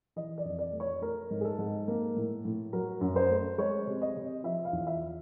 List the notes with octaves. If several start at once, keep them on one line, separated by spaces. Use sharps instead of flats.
E3 D#5
D5
F2
D5
A3
C#5
A3 A#4
G#2
G#4
A4
G#2
A#3
A2
A2
F#3 A#4
F#2
C5
A3
G#3 C#5
C3
D#5
C3
F3 E5
F5
E2
E5